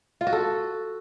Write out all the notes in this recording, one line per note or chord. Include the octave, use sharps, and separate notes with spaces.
F4
F#4
A4